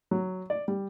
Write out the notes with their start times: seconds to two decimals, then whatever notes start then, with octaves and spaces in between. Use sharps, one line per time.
0.11 F#3
0.50 D5
0.68 G3